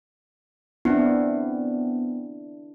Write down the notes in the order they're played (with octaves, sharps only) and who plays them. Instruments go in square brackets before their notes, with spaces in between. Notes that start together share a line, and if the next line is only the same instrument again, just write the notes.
[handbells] B3 C4 [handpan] D4 E4